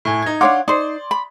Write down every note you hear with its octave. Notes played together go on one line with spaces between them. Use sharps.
A2 G#5
D#4 G#6
D4 C#5 F5 F#5 C6 D6
D#4 C5 D5 C6
B5